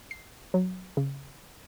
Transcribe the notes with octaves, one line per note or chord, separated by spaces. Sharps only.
C7
F#3
C#3